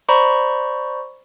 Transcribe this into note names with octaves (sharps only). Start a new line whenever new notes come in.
C5 D5 A#5 B5 C#6